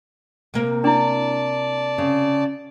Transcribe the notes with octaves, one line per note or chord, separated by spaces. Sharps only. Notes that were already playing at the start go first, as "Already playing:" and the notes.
C3 A#3
D4 E4 D5 A5
C#3